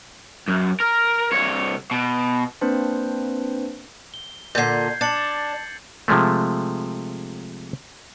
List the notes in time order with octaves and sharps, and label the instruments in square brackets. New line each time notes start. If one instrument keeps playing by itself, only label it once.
[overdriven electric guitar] F#2
A#4
C2 C#5
B2
[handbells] A#3 C4 D4 B4 C5
[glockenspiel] G7
[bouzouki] A#2 D3 [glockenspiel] G6 G#6 C7
[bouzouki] D4 [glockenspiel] A6 C#7 F#7
[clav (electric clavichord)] C3 F3 G#3 A3